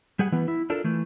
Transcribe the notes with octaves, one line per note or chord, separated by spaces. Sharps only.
G3 G#4 F#5
E3 B3
E4
D4 F4 A4 A#4
E3 A3